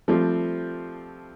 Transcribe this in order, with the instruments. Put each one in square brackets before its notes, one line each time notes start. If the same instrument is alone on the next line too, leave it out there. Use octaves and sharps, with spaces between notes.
[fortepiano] F3 G3 A3 C4 G4